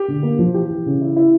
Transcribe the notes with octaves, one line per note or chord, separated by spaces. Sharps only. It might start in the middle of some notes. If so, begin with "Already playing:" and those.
Already playing: G4
D3
A#3
F3
E3 G4
E3
C#3
E4
E4